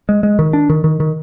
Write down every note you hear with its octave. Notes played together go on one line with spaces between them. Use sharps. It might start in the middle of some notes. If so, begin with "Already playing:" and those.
G#3
G#3
D#3
D4
D#3
D#3
D#3